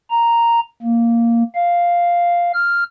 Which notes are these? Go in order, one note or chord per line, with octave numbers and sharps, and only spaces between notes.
A#5
A#3
F5
F6